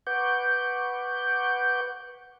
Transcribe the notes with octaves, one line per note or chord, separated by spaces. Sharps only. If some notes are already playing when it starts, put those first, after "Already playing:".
B4 F#5 C#6 D6 G6